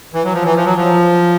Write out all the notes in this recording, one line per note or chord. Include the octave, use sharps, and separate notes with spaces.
E3
F#3
F3
E3
F3
F#3
F3